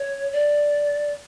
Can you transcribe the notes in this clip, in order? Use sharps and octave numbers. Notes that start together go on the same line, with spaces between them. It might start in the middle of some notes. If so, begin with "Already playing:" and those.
Already playing: C#5
D5